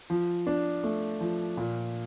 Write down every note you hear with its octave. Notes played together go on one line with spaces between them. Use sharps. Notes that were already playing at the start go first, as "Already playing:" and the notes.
F3
D4
A3
F3
A#2